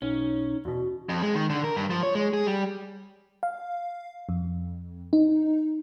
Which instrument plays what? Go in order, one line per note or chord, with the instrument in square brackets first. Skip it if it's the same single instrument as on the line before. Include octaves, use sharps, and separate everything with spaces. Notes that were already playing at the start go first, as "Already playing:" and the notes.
[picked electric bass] B1 [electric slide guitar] C#4 [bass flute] D#4
[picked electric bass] E2 B2 [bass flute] F#4
[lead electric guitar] F2
G#3
D#3
D3
A#4
G2
F3
C#5
G#3
G#4
G3
[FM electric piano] F5
F2
D#4